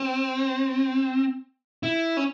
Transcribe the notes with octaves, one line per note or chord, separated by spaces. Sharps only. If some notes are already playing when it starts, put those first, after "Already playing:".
Already playing: C4
E4
C#4